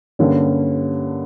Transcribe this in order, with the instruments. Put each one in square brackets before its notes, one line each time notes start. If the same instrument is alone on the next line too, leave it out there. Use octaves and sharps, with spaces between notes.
[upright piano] G2 D3 G3 A#3 C#4